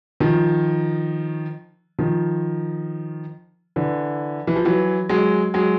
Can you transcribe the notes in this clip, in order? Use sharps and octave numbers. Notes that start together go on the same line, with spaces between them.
D#3 F3
D#3 F3
D3 E3
E3
F3
E3 F#3
F#3 G#3
F#3 G#3